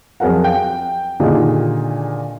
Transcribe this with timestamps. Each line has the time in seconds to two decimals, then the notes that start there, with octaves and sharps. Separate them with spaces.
0.20 F2 F#3 G#4 A#4 F#5
0.44 F5 G5
1.20 A#2 D3 D#3 F4 G4 G#4